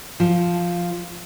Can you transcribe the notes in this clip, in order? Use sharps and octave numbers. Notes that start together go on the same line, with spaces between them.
F3